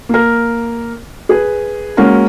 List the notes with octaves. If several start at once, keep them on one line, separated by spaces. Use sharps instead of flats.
A#3 A#4
G#4 B4
G#3 A#3 C#4 F#4 A#4